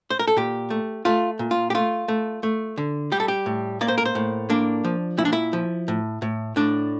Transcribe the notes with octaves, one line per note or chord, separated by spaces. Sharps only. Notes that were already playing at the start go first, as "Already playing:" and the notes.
C5
A#4
A4
A#2 G4
A3
A3 F4
A#2
F4
G4
A3 F4
A3
A3
D3
G3 G4
A4
G4
A2
A#3 D5
C5
A#4
C5
A2
A#3 D4
F3
A#2 E4
D4
E4
F3
A2
A2
A2 D4